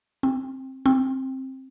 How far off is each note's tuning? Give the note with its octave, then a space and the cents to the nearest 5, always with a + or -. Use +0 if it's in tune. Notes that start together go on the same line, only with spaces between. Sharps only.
C4 +20
C4 +15